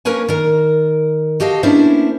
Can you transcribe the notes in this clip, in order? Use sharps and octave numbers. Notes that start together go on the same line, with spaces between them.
A#3 C#4 A#4 B4 C#5 G#5
D#3 A#4
F#4 G4 A4 D#5 F5
A#3 B3 C#4 D4 E4 C5